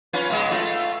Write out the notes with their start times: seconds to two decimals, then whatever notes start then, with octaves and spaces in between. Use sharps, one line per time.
0.13 C#4 F4 B4
0.30 B2 G#3
0.51 A3 F4